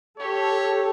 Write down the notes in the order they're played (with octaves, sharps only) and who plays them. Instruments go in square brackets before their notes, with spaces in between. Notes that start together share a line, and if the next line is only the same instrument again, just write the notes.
[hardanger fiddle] G4 [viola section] A4 [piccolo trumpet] C#5